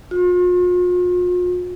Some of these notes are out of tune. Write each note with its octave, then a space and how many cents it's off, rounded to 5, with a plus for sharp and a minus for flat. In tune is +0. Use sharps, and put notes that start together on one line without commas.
F4 +45